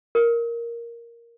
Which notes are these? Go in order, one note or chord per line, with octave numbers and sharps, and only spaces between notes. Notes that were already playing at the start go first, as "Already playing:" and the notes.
A#4